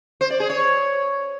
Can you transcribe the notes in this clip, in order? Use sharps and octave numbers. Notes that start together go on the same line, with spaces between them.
C5
D5
G#4
C#5